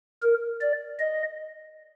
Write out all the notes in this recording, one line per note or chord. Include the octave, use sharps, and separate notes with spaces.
A#4
D5
D#5